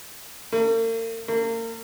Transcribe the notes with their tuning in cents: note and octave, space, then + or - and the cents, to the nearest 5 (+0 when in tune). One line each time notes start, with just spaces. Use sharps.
A#3 -45
A#3 -35